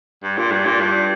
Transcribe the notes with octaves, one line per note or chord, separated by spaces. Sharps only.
G2
A#2
G2
A#2
G2